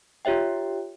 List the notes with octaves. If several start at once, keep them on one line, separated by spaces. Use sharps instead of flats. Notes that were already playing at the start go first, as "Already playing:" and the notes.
F4 G4 C#5 E5 G5